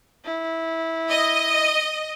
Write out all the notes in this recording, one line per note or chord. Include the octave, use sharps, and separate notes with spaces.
E4
D#5